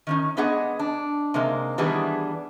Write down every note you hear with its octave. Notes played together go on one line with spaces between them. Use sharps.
D#3 C#4 D#4
G#3 B3 D4 G#4 D#5 F#5
D4
C3 G#3 A#3 D#4
D#3 E3 G3 B3 D4 G#4